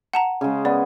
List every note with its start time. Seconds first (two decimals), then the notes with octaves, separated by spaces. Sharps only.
0.14 F#5 A5 A#5
0.41 C#3 G#3
0.65 B3 D5